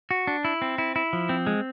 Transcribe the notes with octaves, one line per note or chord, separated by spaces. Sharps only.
F#4
D4
E4
C4
E4
E4
F3
C4
G#3